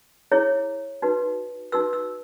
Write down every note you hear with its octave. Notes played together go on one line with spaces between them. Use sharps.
E4 G#4 C#5
D#4 F#4 B4
D#4 F#4 B4 E6
E6